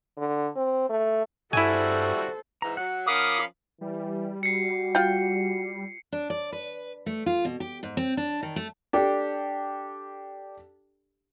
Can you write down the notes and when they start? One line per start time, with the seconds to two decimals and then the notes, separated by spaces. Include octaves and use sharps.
0.17 D3
0.56 C4
0.89 A3
1.53 G2 G3 E4 F#4 A4 C5 E5 G#5
2.62 G#2 E3 A#5
2.77 F#3 F#5
3.07 F3 C#4 A#4 F5 B5 D6 D#6
3.81 E3 G3
4.43 F#4 C7 C#7
4.95 F4 G5
6.12 D4
6.30 D5
6.52 B4
7.06 A3
7.26 F4
7.45 B2
7.60 G4
7.83 G#2
7.97 C4
8.17 D4
8.43 D#3
8.56 A3
8.93 D4 G4 A4